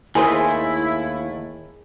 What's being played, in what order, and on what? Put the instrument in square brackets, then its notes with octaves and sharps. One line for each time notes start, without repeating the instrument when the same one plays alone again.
[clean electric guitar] D#2 A3 [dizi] E4 [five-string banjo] G#4 C5 D#5 [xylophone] A#4 G#5